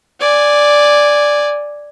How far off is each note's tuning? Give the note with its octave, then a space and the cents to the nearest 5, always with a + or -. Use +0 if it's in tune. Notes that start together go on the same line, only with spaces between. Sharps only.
D5 +0 G#5 -5